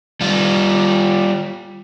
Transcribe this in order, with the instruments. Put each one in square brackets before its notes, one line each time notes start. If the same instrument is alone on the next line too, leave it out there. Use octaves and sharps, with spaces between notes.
[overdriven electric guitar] G3 F4